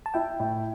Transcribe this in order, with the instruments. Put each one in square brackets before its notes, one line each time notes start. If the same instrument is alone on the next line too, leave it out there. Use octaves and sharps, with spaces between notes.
[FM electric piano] A5
[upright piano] E4 [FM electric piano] G5
[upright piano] A2